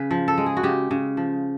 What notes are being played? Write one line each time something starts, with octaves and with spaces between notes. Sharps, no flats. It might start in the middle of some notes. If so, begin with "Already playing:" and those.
Already playing: C#3 B4
F3
A4
G#3
G#4
F#4
C#3 G4
C#3
F3